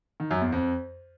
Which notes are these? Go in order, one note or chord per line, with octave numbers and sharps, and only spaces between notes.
D#3
F#2
E2
F2